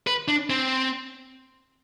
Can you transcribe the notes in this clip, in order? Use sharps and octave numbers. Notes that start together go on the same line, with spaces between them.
B4
D4
C4